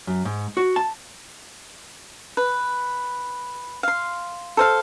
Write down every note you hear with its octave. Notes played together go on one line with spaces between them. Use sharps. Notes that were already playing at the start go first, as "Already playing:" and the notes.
F#2
G#2
F#4
A5
B4
F5 C6
A4 C5 F5